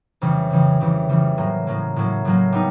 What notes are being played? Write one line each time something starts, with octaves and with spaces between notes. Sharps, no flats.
F2 C#3 E3 G3
F2 C#3 E3 G3
F2 C#3 E3 G3
F2 C#3 E3 G3
A2 F#3 A#3
A2 F#3 A#3
A2 F#3 A#3
A2 F#3 A#3
G3 B3 D#4